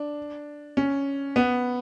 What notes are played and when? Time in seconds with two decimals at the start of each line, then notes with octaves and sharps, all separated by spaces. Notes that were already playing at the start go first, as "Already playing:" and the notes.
Already playing: D4
0.77 C#4
1.36 B3